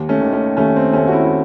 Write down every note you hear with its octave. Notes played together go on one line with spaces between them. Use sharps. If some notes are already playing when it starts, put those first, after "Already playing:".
Already playing: D#2
A3 C#4
D#3
A3 C#4
D#2 A3 C#4
C4
D#2 A3 C#4
F#4
C#4 E4
E4